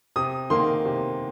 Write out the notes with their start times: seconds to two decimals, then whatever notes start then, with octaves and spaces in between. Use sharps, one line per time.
0.16 C3 D#6
0.50 D#3 A#3 C6
0.85 C3